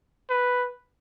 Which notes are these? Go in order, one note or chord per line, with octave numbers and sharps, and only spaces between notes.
B4